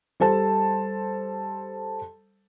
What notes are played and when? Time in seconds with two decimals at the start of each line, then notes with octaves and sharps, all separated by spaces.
0.20 G3 A4 C5 A5